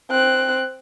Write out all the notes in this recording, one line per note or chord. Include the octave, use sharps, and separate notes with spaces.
C4 F#6